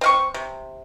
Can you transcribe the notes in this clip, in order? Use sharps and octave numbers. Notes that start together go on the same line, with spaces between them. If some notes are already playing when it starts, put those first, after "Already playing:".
C4 F5 C#6
C3